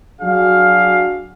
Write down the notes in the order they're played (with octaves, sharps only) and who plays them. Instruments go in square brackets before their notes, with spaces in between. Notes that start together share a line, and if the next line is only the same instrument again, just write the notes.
[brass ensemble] F#3 D4 F#4 G#4 F5